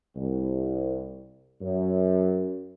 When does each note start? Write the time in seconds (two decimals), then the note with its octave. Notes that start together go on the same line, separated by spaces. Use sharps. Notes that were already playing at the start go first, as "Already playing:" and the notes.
0.16 C2
1.61 F#2